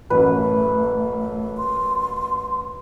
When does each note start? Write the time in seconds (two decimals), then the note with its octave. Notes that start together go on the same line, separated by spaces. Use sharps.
0.10 A1 F#2 A3 B4
1.57 C6